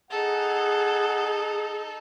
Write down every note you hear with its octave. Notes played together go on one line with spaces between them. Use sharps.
D#4 G#4 A4 F#5